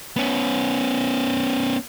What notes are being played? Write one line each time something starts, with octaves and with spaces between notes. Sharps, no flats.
B3 C#4